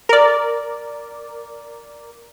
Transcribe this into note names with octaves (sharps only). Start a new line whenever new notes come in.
A#4 D5